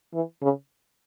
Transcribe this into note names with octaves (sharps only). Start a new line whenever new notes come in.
E3
C#3